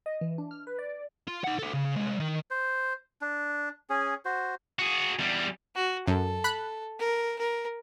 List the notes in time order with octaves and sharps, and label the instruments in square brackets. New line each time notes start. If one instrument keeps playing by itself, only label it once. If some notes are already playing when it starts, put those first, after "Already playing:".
[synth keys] D#5
E3
D4
F6
B4
D5
[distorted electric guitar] F4
D#4 F#5
F#4 A4
C#3
C2 G#3
D#3 D#4
[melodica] C5
D4
C#4 G#4
F#4 C5
[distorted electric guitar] F#4 G#4
E2 G3
[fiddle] F#4
[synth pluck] F#2 [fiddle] A4
[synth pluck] B5 F#6
[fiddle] A#4
A#4